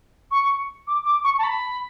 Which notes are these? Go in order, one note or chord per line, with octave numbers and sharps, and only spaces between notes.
C#6
D6
D6
C#6
A5
B5